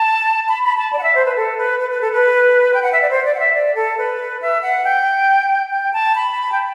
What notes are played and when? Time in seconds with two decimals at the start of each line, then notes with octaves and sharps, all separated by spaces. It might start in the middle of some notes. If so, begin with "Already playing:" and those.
Already playing: A5
0.49 B5
0.63 B5
0.78 A5
0.93 D5
0.99 F#5
1.03 E5
1.15 C5
1.26 B4
1.36 A4
1.58 B4
1.80 B4
1.91 B4
2.01 A4
2.12 B4
2.74 G5
2.82 F#5
2.92 E5
3.02 D5
3.10 C5
3.25 D5
3.35 F#5
3.39 E5
3.54 D5
3.75 A4
3.98 B4
4.41 E5
4.63 F#5
4.85 G5
5.71 G5
5.93 A5
6.15 B5
6.52 G5